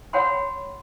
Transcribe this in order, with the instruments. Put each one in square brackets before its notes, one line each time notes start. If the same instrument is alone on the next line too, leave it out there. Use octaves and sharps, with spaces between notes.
[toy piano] C#5 F#5 G5 B5 C6